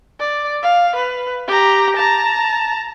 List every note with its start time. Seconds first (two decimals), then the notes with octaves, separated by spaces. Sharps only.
0.20 D5
0.63 F5
0.96 B4
1.47 G4 A#5
1.97 A5 A#5